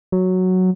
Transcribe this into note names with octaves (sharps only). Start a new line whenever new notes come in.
F#3